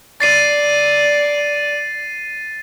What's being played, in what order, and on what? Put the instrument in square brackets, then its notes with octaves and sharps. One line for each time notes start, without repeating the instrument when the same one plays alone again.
[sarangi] D5 [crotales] A6 C7 D#7